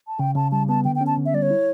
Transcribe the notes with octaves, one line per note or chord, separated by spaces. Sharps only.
A5
C#3 G5
C#3 A5
G3 A5
B3 A5
D3 G5
G5
C#4
A5
D3
E5
G3 D5
C#5
E4